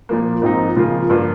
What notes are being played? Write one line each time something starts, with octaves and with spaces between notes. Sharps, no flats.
A#2 F3 A#3
G#2 F3 C4 D#4
C#3 F3 A#3 F4
G2 F3 A#3 F4